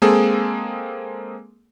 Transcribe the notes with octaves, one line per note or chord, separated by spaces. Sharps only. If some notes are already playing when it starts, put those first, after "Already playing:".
G#3 A#3 C4 G#4 A4